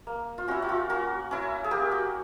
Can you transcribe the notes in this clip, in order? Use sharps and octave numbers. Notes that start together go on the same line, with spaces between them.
A#3
F4
C#4 E4 F#4
F#4
F4
A#3 F#4
C#4 E4
G#4
A#3 G4
F#4